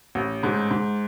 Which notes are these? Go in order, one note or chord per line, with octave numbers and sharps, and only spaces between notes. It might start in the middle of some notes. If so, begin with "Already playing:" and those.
A1
G#2
G#2